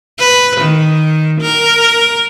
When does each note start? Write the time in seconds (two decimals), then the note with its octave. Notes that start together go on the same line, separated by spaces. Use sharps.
0.19 B4
0.61 D#3
1.41 A#4